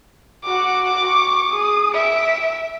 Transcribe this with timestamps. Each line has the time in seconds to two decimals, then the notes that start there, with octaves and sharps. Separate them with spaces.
0.45 F#4 F#5 D6
1.07 C#6
1.52 G#4 D#6
1.95 E5 D7